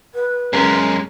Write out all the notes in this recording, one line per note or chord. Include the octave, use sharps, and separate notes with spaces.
B4
F#2 G#3 C#4 G#4 A#4